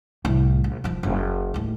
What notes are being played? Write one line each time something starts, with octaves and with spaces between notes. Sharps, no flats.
C2 A2
A#1
D#1 F3
F#1
D#2 A2